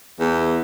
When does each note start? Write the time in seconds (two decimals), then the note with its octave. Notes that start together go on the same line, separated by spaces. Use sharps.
0.20 E2